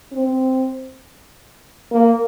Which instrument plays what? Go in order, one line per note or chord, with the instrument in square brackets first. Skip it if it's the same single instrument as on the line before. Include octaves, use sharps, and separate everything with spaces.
[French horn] C4
A#3